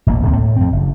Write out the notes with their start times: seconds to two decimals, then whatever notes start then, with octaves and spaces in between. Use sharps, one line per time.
0.06 E1 A1 F#2 A#3
0.22 D1 C#2 C4
0.36 A2
0.56 F2 C4
0.72 F#1